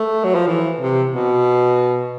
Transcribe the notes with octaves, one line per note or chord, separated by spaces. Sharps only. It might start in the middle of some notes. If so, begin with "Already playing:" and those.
Already playing: A3
F#3
F3
E3
C3
B2